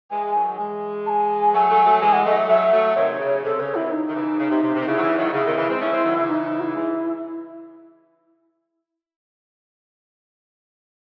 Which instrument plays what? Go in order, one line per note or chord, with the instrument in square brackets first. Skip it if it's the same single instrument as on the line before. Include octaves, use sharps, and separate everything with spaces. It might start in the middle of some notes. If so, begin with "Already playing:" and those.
[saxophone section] E3 G#3 [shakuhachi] G#5
[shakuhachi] G#5
[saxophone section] D#3 F#3
E3 G#3
[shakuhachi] A5
G#5
[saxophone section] F#3 A3 [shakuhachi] G#5
[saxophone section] F#3 A3
F#3 A3
[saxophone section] E3 G#3 [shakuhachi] G#5
[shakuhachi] F#5
[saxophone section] F#3 A3 [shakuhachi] D#5
[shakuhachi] E5
[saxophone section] F#3 A3 [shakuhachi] E5
[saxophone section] F#3 A3
[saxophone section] C3 D#3 [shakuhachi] C#5
[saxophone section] D#3
C#3
[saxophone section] C3 [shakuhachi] A4
[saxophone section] C#3 [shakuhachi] C#5
[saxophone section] C3 D#3 [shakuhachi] E4
[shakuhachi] D#4
[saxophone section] D#3
C#3 E3
C#3
C3
C3
C3
D#3
[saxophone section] C#3 [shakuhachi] E4
[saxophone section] F#3
C#3 E3
D#3 F#3
[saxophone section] C#3 [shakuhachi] E4
[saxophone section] C3 D#3
C#3 E3
G#3 C4
[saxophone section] A3 C#4 [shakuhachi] E4
[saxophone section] G#3 C4
D#3 F#3
C#3 E3
[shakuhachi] D#4
D#4
F#4
E4
[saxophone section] E3 G#3